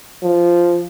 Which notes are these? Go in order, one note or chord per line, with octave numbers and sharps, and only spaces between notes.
F3